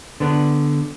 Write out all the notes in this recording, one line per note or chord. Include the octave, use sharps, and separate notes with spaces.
D3 B3 D4